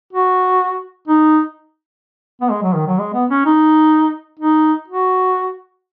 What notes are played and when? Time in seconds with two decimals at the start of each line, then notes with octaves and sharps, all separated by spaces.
0.13 F#4
1.08 D#4
2.41 B3
2.50 G#3
2.62 F#3
2.74 D#3
2.87 F#3
2.98 G#3
3.13 B3
3.30 C#4
3.46 D#4
4.40 D#4
4.88 F#4